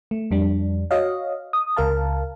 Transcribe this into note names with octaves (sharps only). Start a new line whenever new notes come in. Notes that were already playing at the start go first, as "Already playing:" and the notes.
A3
F2 G3 D4
F#4 C#5 D#5 F5
D#6
C#2 A#4 F5 A5